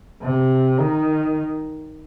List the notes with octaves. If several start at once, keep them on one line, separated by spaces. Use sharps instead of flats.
C3
D#3